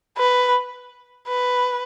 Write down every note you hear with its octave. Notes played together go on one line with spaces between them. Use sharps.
B4
B4